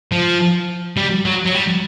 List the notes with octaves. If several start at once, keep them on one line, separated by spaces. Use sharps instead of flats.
F3
G3
F#3
F#3
G3